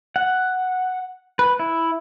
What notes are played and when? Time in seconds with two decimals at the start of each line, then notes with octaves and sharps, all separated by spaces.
0.16 F#5
1.39 B4
1.59 E4